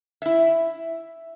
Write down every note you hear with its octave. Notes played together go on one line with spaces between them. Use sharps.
E4 E5